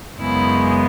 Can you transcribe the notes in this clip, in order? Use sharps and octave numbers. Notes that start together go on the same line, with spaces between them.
F#2 C#3 G#3 B3 E4